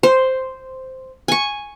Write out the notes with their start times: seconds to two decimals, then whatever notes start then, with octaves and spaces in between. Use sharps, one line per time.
0.03 C5
1.28 G#5 C#6